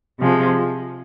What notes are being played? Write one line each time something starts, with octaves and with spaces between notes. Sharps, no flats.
C3 F3 G#3